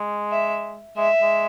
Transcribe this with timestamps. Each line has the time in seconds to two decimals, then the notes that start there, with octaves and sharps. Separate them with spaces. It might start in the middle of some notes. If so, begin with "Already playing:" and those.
Already playing: G#3
0.32 E5
0.97 G#3 E5
1.22 G#3